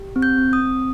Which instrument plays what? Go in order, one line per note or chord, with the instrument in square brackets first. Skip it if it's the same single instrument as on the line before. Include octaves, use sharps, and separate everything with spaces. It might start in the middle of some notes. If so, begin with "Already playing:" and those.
Already playing: [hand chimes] G4
C4
G6
C4
D#6
C4